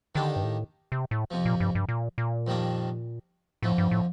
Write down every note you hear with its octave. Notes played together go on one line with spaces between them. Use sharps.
D3 D#3 A#3 D4 G4
G2
A2
C3
A2
F2 C3 F3
A#2
G2
G2
A#2
A#2
F2 D#3 G3 A#3 D4
F2 A2 D3 F3
G2
A2